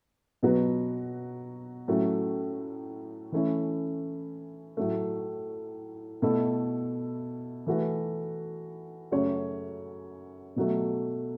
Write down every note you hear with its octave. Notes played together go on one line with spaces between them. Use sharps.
B2 F#3 B3 F#4 B4
A2 F#3 A3 C#4
E3 A3 C#4 E4
A2 F#3 A3
B2 A3 E4 A4
E3 A3 F#4 B4
F#2 C#3 A3 F#4 C#5
B2 F#3 A3